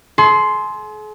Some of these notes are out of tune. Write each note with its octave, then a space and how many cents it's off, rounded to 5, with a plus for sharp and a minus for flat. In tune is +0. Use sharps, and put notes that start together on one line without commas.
G#4 +45 C6 +0